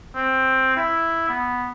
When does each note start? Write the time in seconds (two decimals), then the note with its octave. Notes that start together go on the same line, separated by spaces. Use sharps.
0.15 C4
0.77 E4
1.29 B3